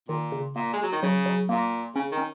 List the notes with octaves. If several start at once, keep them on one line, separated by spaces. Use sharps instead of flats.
A#2 D#3
C#3
A#2 A#3
G#3
F#3
D#3
C#3 F#3
F#3
A#2 A#3
C#3 C#4
D#3
C#4